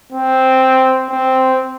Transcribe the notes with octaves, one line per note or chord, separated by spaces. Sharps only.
C4
C4